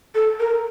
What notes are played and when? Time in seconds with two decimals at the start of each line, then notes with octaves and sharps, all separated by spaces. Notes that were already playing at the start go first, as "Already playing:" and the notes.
0.15 A4
0.40 A#4